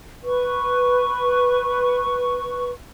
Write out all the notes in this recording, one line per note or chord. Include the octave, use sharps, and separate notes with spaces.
B4 C#6